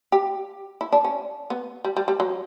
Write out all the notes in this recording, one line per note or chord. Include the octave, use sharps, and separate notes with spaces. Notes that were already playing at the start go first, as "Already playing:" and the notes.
G4
E4
D4
C#4
B3
G3
G3
G3
F#3